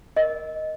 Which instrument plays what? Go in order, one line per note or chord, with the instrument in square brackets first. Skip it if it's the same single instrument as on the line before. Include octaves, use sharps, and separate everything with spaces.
[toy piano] A#4 D#5